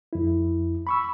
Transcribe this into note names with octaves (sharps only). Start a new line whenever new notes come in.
F2 E4
B5 C#6 E6